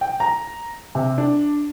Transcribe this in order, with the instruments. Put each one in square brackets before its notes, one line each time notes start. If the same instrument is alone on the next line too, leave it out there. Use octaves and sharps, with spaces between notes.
[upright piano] G5
A#5
C3
D4